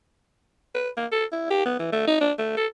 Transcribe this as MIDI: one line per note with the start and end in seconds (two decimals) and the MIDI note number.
0.75 0.89 71
0.97 1.07 58
1.12 1.25 69
1.32 1.47 64
1.50 1.65 67
1.66 1.76 59
1.79 1.90 52
1.92 2.07 57
2.07 2.17 63
2.21 2.32 62
2.39 2.54 57
2.57 2.67 69